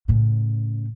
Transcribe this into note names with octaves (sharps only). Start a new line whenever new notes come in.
A2 C#3